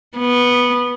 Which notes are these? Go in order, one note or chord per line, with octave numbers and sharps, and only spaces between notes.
B3